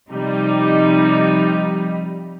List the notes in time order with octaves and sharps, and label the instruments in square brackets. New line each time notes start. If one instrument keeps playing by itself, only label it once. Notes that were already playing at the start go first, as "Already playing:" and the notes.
[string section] C3 F3 G3 D#4